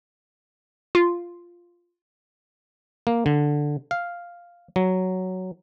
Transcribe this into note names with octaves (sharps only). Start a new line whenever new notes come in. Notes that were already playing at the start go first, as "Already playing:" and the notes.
F4
A#3
D3
F5
F#3